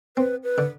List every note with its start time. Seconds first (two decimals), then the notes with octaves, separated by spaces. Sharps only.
0.17 C4 B4
0.44 B4
0.58 D3